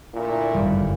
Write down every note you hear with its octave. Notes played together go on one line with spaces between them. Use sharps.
A#2 D3 A3 E4
G1 F#2 D#3 G3